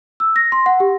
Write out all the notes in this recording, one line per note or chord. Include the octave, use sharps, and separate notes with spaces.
E6
A#6
C6
F#5
G4